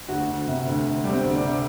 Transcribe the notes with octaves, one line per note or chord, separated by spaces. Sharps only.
D2 F#4
D2
C3
D2
D2
G3
C4
D2
D4
C3